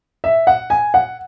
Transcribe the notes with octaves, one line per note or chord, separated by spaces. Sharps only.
E5
F#5
G#5
F#5